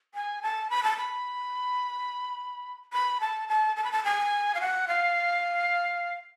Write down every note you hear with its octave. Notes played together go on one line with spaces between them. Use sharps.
G#5
A5
B5
A5
B5
B5
A5
A5
A5
B5
A5
G#5
F5
F#5
F5